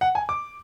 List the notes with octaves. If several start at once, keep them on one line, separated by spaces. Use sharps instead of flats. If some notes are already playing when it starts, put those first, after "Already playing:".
F#5
G#5
D6